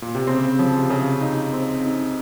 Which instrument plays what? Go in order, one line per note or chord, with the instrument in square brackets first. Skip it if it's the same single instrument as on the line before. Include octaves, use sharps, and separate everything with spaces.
[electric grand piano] A#2
C3
[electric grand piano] C#3 [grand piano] C4
[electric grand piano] C#3 [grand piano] F3
[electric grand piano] C3
[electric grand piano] C#3 [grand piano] G#4
[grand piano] D#4
C4
D#4